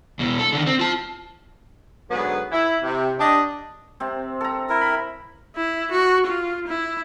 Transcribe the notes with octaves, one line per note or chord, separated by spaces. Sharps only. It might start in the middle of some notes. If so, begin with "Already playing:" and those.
E2 B2
A4
D3 D#3
C4
F4 A5
G#2 D3 F#3 B3 G#4 B4
E4
C3
D4 G4 D#5
C3 C4
A4 A#5
E4 A#4
B5
E4
F#4
F4
E4